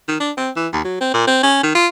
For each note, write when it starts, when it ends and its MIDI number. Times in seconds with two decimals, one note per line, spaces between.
0.08 0.17 51
0.20 0.32 62
0.37 0.50 60
0.56 0.68 52
0.73 0.80 39
0.84 0.98 54
1.01 1.11 60
1.14 1.26 46
1.27 1.38 60
1.43 1.59 61
1.63 1.74 51
1.75 1.87 65